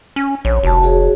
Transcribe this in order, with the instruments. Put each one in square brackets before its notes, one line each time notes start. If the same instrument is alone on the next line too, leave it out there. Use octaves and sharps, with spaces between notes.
[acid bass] C#4
[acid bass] A#1 [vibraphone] C#5
[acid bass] F1 [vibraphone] F#4 A5
[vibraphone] F#4 G#4 C#5